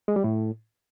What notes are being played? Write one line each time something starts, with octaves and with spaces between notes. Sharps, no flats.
G#3
G3
A2